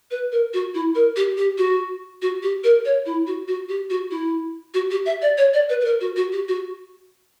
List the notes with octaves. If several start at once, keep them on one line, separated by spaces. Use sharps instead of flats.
B4
A#4
F#4
E4
A#4
G4
G4
F#4
F#4
G4
A#4
C#5
E4
F#4
F#4
G4
F#4
E4
F#4
G4
E5
D5
C#5
D5
B4
B4
A#4
F#4
F#4
G4
F#4